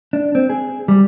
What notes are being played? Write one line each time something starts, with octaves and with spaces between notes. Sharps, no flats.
D4
C4
G#4
G3